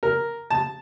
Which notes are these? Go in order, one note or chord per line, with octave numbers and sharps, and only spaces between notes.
A#4
A5